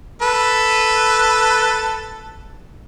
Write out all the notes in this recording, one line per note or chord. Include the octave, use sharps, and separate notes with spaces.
A4 B4